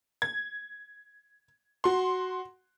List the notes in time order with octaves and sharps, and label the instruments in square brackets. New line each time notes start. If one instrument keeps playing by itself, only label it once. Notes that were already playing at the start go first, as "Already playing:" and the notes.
[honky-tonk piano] G#6
F#4 C6